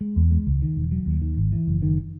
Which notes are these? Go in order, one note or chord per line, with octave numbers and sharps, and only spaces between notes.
G#3
E2
G#3
C#2
D#3
E1
F#3
D#2
D#3
G#1
E3
F#1
D#3